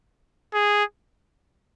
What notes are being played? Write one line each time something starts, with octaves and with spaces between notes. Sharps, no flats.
G#4